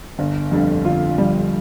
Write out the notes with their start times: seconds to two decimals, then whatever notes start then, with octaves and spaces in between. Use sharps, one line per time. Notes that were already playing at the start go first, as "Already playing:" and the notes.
0.19 G1
0.51 F2 D3 G3
0.85 G1 F4
1.18 F2 D3 G3